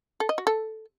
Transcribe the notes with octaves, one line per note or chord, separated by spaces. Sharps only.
A4
D#5
F#4
A4